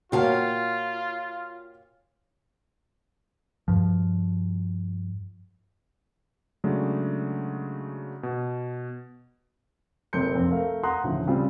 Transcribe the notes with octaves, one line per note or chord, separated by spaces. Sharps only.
A#2 F4 F#4 C#5 F5 G5 A5
G2 F3
C#3 F#3 G#3 A3 D4
B2
F#1 C3 A4 C6 G6 C#7
A#1 F2 C4
A3 A#4 F5
F#5 A#5 C6 D#6 F#6
D2 A2 C#3 E3 F3
C#3 G3 C4 F4